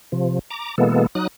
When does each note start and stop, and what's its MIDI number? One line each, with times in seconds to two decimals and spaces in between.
0.12 0.39 48
0.12 0.39 53
0.50 0.75 82
0.50 0.75 86
0.78 1.06 47
0.78 1.06 52
0.78 1.06 56
0.78 1.06 58
0.78 1.06 59
0.78 1.06 69
1.15 1.27 54
1.15 1.27 63
1.15 1.27 87
1.15 1.27 90